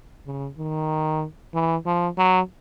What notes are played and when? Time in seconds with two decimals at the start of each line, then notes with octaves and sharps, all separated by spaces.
0.26 C#3
0.58 D#3
1.54 E3
1.86 F3
2.18 F#3